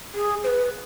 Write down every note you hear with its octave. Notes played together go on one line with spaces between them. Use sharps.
G#4
C5
B4